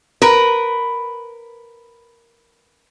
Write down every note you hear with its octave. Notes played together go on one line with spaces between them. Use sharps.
A#4 B4